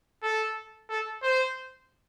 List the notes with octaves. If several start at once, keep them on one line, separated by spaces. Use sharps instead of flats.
A4
A4
C5